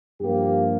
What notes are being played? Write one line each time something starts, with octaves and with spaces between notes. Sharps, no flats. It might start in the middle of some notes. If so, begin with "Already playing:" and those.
G2 F3 A#3 G4